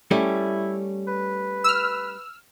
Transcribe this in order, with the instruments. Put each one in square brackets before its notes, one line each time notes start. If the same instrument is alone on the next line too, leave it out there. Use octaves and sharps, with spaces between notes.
[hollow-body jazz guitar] G3 A3 C#4 [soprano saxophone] E4
[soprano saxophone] B4
[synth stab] E6 F6